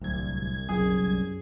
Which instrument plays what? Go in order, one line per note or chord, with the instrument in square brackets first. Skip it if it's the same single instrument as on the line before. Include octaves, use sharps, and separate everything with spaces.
[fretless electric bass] D1 [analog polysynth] C2 G#6
[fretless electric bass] F#1 B1 [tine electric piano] F#2 [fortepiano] G#4